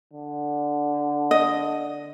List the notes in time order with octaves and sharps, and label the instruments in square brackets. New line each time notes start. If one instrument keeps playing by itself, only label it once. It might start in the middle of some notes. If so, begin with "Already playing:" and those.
[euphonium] D3
[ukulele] D#5